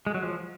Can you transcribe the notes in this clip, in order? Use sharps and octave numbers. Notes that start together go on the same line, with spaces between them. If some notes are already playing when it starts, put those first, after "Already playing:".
G#3
F#3
F3